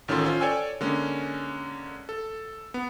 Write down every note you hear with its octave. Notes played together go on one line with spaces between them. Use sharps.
A1 D#3 C#4 F4 A4 C6
C#4 F4 C5
A4 C#5 D5 G5 G#5 E6
D3 G#3 A#3 C#4
A4
B3